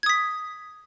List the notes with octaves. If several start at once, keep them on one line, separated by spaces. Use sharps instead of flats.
D#6 G#6 B6